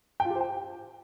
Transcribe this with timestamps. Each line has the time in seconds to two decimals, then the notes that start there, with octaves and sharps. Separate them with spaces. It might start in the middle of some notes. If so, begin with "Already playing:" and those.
0.20 G5
0.25 F4
0.30 G4
0.35 C5
0.41 G5